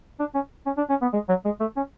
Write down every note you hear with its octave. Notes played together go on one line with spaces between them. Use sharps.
D4
C#4
C#4
D4
C#4
B3
G#3
F#3
G#3
A3
C#4